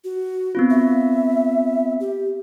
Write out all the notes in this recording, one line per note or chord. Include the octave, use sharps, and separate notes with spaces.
F#4
B3 C4 F4
E5
G4